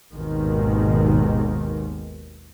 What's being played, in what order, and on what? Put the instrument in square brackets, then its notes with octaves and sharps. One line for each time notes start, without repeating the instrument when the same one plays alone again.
[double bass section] G#1 D#2 B2 D#3 G#3